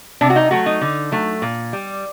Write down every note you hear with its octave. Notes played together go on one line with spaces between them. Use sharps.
C3 D4
F#4
D#4
F#3 A3 F#4
D#4
D3
F#3 A3
A#2
G3